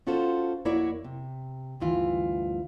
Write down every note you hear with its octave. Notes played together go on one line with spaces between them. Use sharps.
C#4 F4 F#4 A4 C5
F2 A#3 E4 F#4 C#5 D5
C3
D2 G2 E3 F4